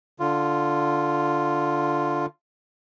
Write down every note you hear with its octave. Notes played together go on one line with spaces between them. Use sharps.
D3 F4